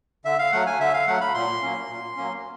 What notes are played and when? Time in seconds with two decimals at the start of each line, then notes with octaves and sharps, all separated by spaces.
0.25 D3 E5
0.39 F5
0.52 F#3 A3 F#5
0.67 G#5
0.80 D3 E5
0.93 F5
1.07 F#3 A3 F#5
1.21 B5
1.34 A#2 C6
1.62 F#3 A#3 C#4
1.90 A#2
2.17 F#3 A#3 C#4